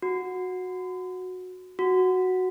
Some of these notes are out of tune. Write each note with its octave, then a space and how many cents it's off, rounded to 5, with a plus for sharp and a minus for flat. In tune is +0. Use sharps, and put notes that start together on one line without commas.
F#4 -15
F#4 +0